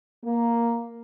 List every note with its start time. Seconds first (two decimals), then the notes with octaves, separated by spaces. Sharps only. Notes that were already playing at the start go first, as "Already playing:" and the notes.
0.25 A#3